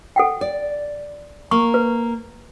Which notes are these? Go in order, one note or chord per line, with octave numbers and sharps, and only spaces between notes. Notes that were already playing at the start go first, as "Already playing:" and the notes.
A4 F#5 G5
D5
A#3 C#6
B4